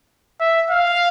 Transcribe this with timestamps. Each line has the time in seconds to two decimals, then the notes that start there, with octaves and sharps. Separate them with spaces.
0.40 E5
0.70 F5